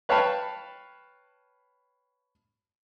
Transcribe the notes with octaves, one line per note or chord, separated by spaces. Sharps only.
B4 C#5 F5 G5 A5 B5